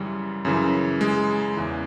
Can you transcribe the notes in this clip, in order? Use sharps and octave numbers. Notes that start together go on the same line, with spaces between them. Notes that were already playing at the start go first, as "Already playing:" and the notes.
Already playing: F#2 C#3 E3 G3
F#2 C#3 E3
G#3
E2 C#3 E3